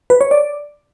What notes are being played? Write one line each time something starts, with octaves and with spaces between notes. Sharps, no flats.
B4
C#5
D5